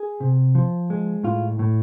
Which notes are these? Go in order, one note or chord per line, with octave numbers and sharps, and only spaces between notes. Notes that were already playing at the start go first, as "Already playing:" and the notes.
Already playing: G#4
C3
F3
G#3
A2 F4
A2